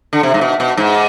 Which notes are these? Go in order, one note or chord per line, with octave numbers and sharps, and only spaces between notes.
D3
C3
G#2
B2
B2
G#2